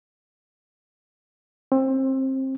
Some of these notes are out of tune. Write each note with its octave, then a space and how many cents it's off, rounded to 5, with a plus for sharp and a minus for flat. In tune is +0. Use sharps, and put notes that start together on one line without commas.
C4 +25